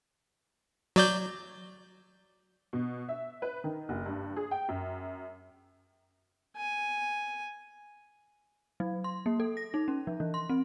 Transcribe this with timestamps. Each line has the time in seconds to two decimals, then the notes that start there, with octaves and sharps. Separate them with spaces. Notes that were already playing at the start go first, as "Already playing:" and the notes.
0.96 F#3 D5 G6
2.73 B2
3.09 E5
3.42 B4
3.64 D#3
3.89 F#1
4.06 G2
4.36 G#4
4.51 G5
4.68 F#2
6.57 G#5
8.80 F#3
9.04 C6
9.26 A#3
9.40 A4
9.57 A#6
9.74 D#4
9.88 C#4
10.07 F3
10.20 E3
10.34 C6
10.49 C4